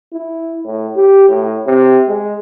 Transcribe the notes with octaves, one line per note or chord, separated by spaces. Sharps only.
E4
A2
G4
A2
C3
G#3